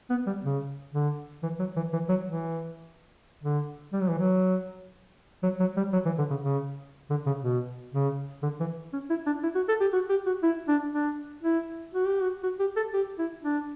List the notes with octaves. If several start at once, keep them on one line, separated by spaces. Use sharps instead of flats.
B3
G3
C#3
D3
E3
F#3
E3
E3
F#3
E3
D3
G3
F#3
E3
F#3
F#3
F#3
G3
F#3
E3
D3
C#3
C#3
D3
C#3
B2
C#3
D3
E3
C#4
E4
D4
E4
F#4
A4
G4
F#4
G4
F#4
E4
D4
D4
E4
F#4
G4
F#4
F#4
G4
A4
G4
E4
D4